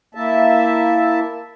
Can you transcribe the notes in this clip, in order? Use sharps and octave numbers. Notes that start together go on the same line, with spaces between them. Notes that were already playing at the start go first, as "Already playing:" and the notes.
A#3 E4 E5 A5